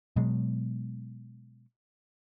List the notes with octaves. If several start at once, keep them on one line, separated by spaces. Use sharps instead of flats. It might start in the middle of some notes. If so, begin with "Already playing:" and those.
B2 F#3 G#3